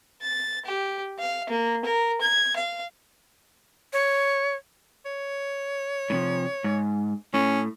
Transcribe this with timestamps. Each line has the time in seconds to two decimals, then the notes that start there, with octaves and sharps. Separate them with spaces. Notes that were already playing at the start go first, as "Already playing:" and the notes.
0.22 A6
0.65 G4
1.19 F5
1.49 A#3
1.85 A#4
2.21 G#6
2.56 F5
3.93 C#5
5.06 C#5
6.10 A2 C3 F3
6.64 G#2
7.34 A2 C#4